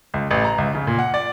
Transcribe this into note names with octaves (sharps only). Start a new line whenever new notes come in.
C#2
A1
A#5
C#2
C#3
A#2
F#5
D5